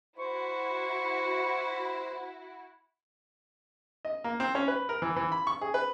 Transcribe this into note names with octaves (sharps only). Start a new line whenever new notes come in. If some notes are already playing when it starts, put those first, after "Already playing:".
E4 F#4 C5 C#6
D#5
A#3
C4
C#4
B4
A#4
E3
E3
B5
C#6
G#4
B4